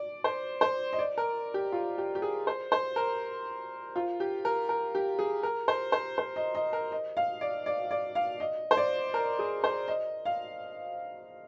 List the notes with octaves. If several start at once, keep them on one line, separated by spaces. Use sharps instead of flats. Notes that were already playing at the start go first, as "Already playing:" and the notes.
Already playing: D5
C5
C5
D#5
D5
A#4
G4
F4
G4
G4
G#4
C5
C5
A#4
F4
G4
A#4
A#4
G4
G#4
A#4
C5
C5
C5
D#5
D#5
A#4
D#5
F5
D5
D5
D5
F5
D#5
C5
D5
A#4
G#4
C5
D#5
F5